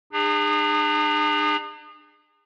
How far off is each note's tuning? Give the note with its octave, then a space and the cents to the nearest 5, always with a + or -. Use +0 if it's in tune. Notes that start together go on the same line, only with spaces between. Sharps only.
D4 +45 G#4 -30